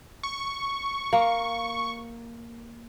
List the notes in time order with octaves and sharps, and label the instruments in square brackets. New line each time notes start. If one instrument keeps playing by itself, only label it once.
[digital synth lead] C#6
[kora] A#3